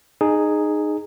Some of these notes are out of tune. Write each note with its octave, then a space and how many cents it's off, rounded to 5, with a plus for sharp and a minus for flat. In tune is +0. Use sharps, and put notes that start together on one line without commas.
D#4 -20 G#4 +0